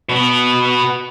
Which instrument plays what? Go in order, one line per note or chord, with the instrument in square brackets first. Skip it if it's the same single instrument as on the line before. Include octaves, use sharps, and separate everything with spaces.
[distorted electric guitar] B2 B3